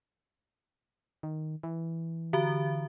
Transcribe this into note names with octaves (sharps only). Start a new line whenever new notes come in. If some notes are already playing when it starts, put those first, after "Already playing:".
D#3
E3
D3 F#4